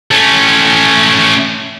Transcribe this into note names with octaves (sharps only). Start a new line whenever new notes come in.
A3 C#4